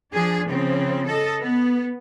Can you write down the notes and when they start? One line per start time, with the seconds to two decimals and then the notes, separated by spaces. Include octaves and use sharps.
0.13 F3 D4 G#4
0.48 C#3 F3 C4
1.06 A4 D#5
1.41 B3